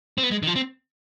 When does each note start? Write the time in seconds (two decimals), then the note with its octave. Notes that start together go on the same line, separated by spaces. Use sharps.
0.18 C4
0.23 B3
0.31 G#3
0.43 D#3
0.47 F3
0.56 C4